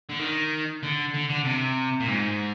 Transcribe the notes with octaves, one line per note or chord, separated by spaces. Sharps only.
D3
D#3
D3
D3
D3
C3
A#2
G#2